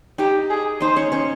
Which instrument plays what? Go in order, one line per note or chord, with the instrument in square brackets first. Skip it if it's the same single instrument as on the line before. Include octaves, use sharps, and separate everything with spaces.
[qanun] D#4 D#5 [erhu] G4
[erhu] G#4
[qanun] D#4 D#5 [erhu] C5
[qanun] C#4 C#5
C#4 C#5